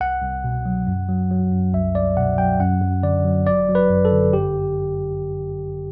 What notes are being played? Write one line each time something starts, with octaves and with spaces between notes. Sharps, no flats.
C2 F#5
C2
B2
F#3
F#2
F#3
F#3
F#2
C2 E5
C2 D5
B2 F#5
F#3 G5
F#2 F#5
F#2
D3 D5
F#3
G1 D5
F#3
B4
F#2
A4
D3
G1 G4